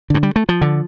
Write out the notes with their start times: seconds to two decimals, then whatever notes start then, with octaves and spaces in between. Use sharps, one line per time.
0.10 G2 D3
0.23 G3
0.36 A3
0.49 F3
0.61 D3